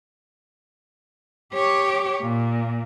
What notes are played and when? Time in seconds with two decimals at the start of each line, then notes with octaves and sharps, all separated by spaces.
1.54 G4 C#5
2.22 A#2